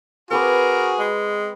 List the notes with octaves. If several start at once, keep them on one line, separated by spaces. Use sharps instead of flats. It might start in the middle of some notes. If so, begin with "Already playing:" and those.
C4 F#4 G#4 A#4 B4 D6
G#3